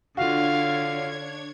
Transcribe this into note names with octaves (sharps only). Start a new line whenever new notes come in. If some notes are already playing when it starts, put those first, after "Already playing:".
D3 D4 F4 F#4 C#5 F5 G#6